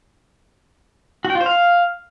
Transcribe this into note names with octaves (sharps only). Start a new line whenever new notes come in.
F#4
G5
F4
C5
F5